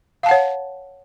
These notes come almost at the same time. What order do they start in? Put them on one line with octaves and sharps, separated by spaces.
F5 A5 F#5 C#5